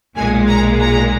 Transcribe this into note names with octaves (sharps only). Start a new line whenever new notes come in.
B1 A#2 G#3 G#5
A#5
A#5